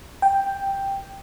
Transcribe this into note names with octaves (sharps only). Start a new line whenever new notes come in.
G5